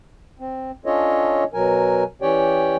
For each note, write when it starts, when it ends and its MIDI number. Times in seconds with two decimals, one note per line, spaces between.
0.40 0.71 60
0.86 1.44 61
0.86 1.44 62
0.86 1.44 65
0.86 1.44 69
0.86 1.44 73
0.86 1.44 75
1.54 2.04 47
1.54 2.04 54
1.54 2.04 70
1.54 2.04 80
2.22 2.76 52
2.22 2.76 61
2.22 2.76 67
2.22 2.76 73
2.22 2.76 74
2.22 2.76 79